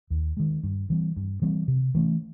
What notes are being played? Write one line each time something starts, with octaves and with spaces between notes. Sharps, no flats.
D#2
D#3 G#3
G2
E3 G3 C4
G2
E3 G3 C4
C3
E3 A3 C#4